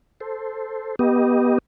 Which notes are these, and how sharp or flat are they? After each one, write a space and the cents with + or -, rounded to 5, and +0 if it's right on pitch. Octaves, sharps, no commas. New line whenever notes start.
A4 +0 C5 +0
B3 -20 G4 +0 D#5 +0